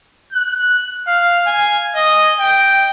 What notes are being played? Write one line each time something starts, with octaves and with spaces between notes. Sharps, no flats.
F#6
F5
G#5
D#5
G5